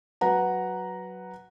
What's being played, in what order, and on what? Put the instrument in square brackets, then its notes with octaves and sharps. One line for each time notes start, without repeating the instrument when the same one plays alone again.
[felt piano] F#3 B4 F#5 A#5